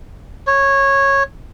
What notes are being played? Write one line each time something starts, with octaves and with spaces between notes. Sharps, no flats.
C#5